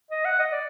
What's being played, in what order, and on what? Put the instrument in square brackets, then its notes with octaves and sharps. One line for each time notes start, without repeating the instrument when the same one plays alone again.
[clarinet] D#5
F#5
D#5
D5